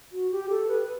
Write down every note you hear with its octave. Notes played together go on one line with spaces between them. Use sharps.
F#4
G4
A4
B4